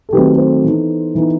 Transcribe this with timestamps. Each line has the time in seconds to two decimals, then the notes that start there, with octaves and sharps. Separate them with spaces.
0.09 A4
0.13 D#3 F#3 A3 C4 G4 B4
0.38 A4 C5
0.64 E3 B3 D#4
1.15 E3 B3 D#4